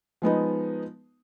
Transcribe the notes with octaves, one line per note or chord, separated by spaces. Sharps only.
F3 G#3 B3 D#4